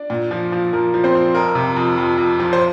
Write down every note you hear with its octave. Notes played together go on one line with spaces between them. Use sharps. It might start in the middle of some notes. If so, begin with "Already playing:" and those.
Already playing: D4 D5
A#2
F3
F3
F3 A#4
F3
C4 C5
F3
F2 A#4
C3
F2
F2
F2
F3
C5